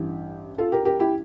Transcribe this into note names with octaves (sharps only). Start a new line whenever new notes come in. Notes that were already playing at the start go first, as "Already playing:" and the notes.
Already playing: A1 G2 E3 G4
F4 A4
G4 A#4
G4 A#4
E4 G4